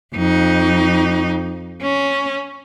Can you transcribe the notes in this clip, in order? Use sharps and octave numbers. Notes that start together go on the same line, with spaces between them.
F2 D#4
C#4